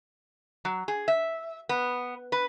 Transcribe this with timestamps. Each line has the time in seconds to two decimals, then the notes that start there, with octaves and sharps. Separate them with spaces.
0.65 F#3
0.88 G#4
1.08 E5
1.69 B3
2.32 B4